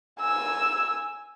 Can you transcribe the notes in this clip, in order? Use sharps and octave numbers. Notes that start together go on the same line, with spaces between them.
G#5 E6